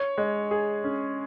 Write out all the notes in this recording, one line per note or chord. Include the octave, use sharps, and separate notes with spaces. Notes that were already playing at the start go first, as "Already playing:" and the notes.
Already playing: C#5
G#3
G#4
C#4